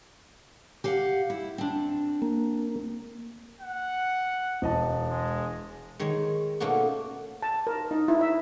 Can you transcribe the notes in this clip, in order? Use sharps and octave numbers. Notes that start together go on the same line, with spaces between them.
G4 F5 F#5
E4
C4 D4
A#3
F#5
E1 D#5 A5
G#3
D#3 G#3 C#5
B2 A3 A#3 C#4 D#4 F#4
A5
A#4
D#4
E4
E5